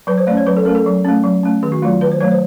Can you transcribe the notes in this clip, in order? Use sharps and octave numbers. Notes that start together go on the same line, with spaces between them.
F#3 B4
C5
A3 C#4 D5
C#5
F#3 B4
A4
A3 C#4 A#4
A4
F#3
A3 C#4
F#3
A3 C#4
D#3 G#4
F#4
F#3 A3 F4
D#3 B4
C5
F#3 A3 C#5
C5